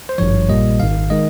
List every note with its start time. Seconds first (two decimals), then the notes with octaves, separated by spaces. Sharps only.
0.09 C5
0.18 G#1 G2 F3 C#5
0.49 A#1 A#2 G3 A#3 D#5
0.80 G#1 G#2 D#3 F5
1.10 D#3 G#3 D#5